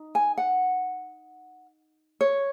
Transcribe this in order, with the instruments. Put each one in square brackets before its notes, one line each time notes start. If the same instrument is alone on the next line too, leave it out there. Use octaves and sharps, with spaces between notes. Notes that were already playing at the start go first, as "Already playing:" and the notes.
Already playing: [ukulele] D#4
G#5
F#5
C#5